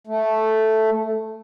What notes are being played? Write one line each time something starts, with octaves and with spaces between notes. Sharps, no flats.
A3